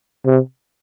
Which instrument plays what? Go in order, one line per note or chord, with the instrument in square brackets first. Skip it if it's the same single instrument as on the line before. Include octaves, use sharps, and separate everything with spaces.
[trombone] C3